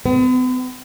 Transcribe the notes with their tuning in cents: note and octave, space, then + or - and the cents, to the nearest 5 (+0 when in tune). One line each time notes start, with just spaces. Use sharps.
B3 +45